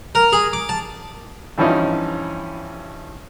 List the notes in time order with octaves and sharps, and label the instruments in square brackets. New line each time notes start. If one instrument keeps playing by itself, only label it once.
[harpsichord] A#4
G#4
D6
A5
[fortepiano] G2 E3 F3 C#4 D#4 E4